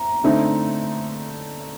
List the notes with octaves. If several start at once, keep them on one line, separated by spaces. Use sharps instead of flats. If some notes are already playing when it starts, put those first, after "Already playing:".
Already playing: A#5
D3 A3 C4 D#4